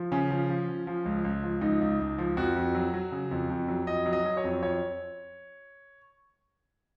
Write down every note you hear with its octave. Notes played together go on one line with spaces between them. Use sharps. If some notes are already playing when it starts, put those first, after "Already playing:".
Already playing: F3
C#3 C#4
F3
F3
F3
F3
C#2
C#2
F3
C#2 D#4
C#2
C#2
F3
F2 F#4
F2
F#3
F#3
C#3
F2
F2
F#3
F2 D#5
F#3
D#5
F#3
C#5
F2
F2 C#5